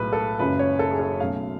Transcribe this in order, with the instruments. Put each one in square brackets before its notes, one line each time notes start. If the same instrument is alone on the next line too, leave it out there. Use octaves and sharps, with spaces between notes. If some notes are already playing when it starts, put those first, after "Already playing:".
Already playing: [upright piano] B1 A2 G#3 B4
A4
F#1 F#2 C#3 G#3 C#4 B4
C#5
A4
G#4
A4
B1 B2 A3 C#4 F5